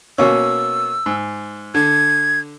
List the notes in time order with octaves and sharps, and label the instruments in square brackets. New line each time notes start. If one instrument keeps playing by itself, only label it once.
[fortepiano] B2 A#3 C#4 [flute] E6
[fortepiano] G#2
[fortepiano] D3 [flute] G#6